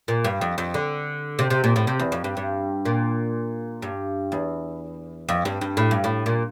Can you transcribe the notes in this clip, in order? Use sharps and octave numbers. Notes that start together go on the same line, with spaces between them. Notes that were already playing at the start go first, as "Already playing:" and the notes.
A#2
G2
F2
F2
D3
C3
C3
A#2
A2
C3
E2
F2
G2
G2
A#2
G2
E2
F2
G2
G2
A2
G2
A2
A#2